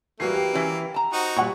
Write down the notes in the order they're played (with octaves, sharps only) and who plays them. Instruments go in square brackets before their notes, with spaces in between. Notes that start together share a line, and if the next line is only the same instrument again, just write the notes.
[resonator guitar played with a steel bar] E3 [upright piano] G3 F#4 C7 [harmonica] A#3 [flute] B4
[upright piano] G4
[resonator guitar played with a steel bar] E3 C#4 E4
A5 A#5
[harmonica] D#4 F#4 [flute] C5
[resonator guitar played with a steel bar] A#2 [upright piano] G3 F#5 C#6